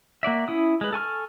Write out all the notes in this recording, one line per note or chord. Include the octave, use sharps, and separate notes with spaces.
A#3 F#4 D5 E5
C#4 E4 D#6
G#3 B4
A4 G#5 C#6 F6